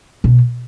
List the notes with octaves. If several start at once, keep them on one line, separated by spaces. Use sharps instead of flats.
B2